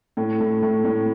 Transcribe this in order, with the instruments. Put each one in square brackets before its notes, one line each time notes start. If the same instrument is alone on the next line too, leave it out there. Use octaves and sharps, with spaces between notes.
[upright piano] A2
A2
A2
A2